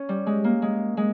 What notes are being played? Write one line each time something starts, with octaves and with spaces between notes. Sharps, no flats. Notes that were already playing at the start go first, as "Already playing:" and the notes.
Already playing: C#4
G3
G#3
A#3
G#3
G#3